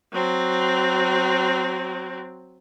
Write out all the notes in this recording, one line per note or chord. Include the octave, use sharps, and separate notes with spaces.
F#3 C4